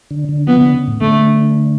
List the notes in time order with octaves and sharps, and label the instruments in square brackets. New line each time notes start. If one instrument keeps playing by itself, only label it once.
[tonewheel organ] D3
D3
[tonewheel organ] F3 [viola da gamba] B3
[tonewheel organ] C#3
D3
C#3
A2
[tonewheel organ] D3 [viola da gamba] A3